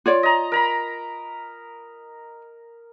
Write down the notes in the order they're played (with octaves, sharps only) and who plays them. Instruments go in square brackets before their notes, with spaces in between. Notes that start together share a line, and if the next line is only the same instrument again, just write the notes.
[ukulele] F4 C#5 D5
[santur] D#5 A#5
A#4 A#5 B5